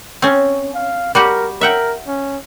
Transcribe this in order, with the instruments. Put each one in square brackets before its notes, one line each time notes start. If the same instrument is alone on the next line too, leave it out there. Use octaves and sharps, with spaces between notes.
[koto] C4 C#4
[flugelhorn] F5
[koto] G3 F#4 G4 [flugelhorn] A#4
[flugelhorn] A#4 [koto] E5 F#5 G5
[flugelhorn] C#4